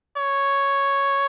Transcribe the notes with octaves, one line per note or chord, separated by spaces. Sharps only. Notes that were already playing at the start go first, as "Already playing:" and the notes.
C#5